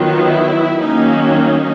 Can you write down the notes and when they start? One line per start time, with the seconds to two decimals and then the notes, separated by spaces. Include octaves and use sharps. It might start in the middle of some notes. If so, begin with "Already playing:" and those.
Already playing: D#3 F#3 B3 F4
0.25 E4
0.80 D#3 F#3 A#3 C#4 D#4
1.35 D#4